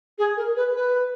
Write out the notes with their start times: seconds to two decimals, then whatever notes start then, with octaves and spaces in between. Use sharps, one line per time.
0.18 G#4
0.37 A#4
0.56 B4
0.76 B4